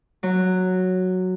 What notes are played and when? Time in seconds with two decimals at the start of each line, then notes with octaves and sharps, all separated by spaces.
0.23 F#3